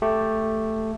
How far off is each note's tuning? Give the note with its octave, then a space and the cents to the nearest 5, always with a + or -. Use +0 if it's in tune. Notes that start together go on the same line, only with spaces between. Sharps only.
A3 +0 G4 +0